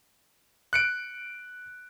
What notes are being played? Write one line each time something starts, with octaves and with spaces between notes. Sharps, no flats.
F#6 C#7 D7